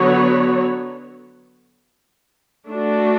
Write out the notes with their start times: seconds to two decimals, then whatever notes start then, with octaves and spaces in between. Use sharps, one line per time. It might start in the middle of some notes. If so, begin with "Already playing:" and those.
Already playing: D3 F#3 B3 F#4 C#5
2.67 A3 D4 F#4